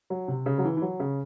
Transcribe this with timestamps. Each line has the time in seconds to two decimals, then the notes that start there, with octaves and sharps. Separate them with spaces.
0.10 F#3
0.28 C3
0.46 C#3
0.58 F#3
0.65 E3
0.77 E3
0.82 F#3
1.00 C#3